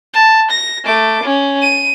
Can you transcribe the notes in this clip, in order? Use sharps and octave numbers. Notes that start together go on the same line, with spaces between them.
A5
A#6
A3 D6
C#4
D#7